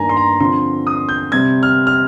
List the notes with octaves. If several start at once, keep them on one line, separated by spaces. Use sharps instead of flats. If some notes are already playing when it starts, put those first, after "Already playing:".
Already playing: G2 D#3 A#3 G#5 A#5
C6
A#5
D3 F3 C4 C6
D#6
G6
C3 G3 C4 G#6
F6
F6